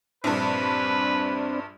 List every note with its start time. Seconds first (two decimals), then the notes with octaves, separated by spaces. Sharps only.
0.24 A#1 G2 C4 D4 B4